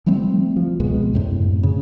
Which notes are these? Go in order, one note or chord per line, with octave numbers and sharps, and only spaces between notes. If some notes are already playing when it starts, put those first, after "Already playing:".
F3 G3 A3 C4
F3
C#2 B2 G#3
F#2 A2 C3
C#3